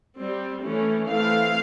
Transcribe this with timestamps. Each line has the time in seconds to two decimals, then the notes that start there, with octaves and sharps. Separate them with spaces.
0.18 G3 C4
0.63 E3 A3 C#4
1.09 E3 A3 C4 F5